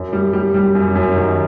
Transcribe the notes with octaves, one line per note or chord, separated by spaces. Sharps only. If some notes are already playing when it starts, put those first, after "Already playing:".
Already playing: F#2
G3
G3
G3
F#2
F#2
D#3